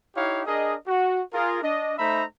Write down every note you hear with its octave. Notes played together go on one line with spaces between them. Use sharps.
D#4 E4 G4 C#5 F5
D4 G#4 A#4 D#5
F#4
F4 G#4 A#4
D4 D#5
A3 D#4 C5 E5 A#5 B5